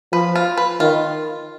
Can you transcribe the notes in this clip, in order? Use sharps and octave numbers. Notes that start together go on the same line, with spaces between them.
F3 B4
F4
B4
D#3 F4